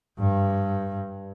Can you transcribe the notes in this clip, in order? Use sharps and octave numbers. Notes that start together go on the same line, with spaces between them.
G2